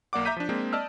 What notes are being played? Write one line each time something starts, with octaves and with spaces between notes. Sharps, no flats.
B1 A#3 D5 F#5 D6
E5 A#5 D6 G6 B6 D#7
F3 D4
G#3 A#3 C4 D4
D5 D#5 A5 E6 F6